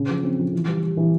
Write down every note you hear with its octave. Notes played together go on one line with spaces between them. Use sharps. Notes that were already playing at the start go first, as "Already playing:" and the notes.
Already playing: C#3
F3
C4
F3
E3
G3
G3
E3